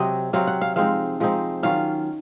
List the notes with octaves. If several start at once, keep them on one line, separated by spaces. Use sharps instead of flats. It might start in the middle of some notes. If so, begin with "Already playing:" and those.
Already playing: C3 F#3 C4 D#5
C3 F#3 C4 F5
F#5
F5
F3 G#3 C4 D#4 F5
F3 G#3 C4 D#4
D#3 F#3 C#4 F4 F5